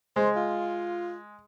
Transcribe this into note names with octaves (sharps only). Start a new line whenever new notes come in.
G#3 C5
F4